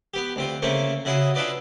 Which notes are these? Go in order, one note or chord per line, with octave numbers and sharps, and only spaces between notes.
B3 G4
D2 C4 F4
C#3 A3 A#3 C5 C#6
C#3 E4 F#4 G#4 D#6
D4 E4 F4 B4 D5 D#5